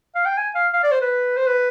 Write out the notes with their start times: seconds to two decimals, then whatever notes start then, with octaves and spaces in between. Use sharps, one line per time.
0.15 F5
0.25 G5
0.37 G#5
0.55 F5
0.73 F5
0.83 D5
0.91 C5
1.01 B4
1.36 C5
1.47 B4